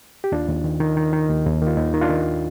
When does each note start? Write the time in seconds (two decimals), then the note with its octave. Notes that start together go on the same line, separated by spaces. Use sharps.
0.24 G4
0.32 D#2 D4 F4
0.48 D#2
0.64 D#3
0.80 D#3
0.97 D#3
1.13 D#3
1.30 D#2
1.46 D#2
1.62 D#3 F4
1.77 D#2 D#4
1.94 D#3
2.01 D4 F4
2.10 D#3